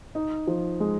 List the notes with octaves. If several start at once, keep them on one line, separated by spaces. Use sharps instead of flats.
D#4
F3
G#3